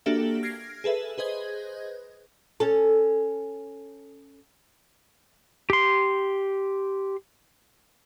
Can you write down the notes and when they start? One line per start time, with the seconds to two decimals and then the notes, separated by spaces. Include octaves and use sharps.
0.06 A#3 D4 F#4 G4 A4 E5
0.43 F6 G#6 A#6 C7 D7
0.84 G#4 A4 B4 E5
1.18 G#4 B4 C5 D#5 G#6
2.60 C#4 A4
5.70 G4 C6